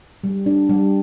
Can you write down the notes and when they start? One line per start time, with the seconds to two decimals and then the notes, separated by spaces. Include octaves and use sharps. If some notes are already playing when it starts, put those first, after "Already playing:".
0.24 G3
0.46 D4
0.69 G3